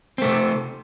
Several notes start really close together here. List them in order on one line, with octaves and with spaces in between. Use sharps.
C4 A3 C3